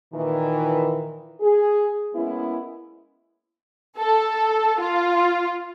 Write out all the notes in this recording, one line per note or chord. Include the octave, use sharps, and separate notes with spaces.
A#2 D#3 E3
G#4
G#3 A#3 B3 C#4 E4
A4
F4